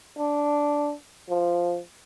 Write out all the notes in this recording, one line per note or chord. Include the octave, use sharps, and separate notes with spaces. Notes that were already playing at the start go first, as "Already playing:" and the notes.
D4
F3